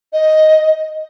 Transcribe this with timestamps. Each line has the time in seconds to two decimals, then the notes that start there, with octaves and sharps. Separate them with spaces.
0.13 D#5